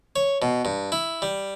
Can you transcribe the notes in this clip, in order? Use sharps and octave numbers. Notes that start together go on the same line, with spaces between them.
C#5
B2
G2
E4
G3